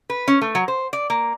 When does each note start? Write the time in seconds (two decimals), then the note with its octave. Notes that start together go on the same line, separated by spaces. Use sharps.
0.10 B4
0.28 C#4
0.41 A3
0.55 F#3
0.68 C5
0.93 D5
1.10 A#3